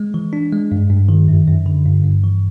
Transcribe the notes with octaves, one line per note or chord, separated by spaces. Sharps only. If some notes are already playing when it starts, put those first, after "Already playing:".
Already playing: G#3
E3
D4
G#3
G2
G2
D#3
F#2
F#2
D3
G2
G2
E3